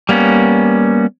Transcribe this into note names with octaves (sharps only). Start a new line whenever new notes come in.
G3 A#3 B3 C#4